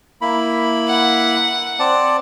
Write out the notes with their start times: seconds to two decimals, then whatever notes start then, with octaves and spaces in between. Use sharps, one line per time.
0.22 A#3 E4 B5
0.89 F#5
1.80 C4 D5 A5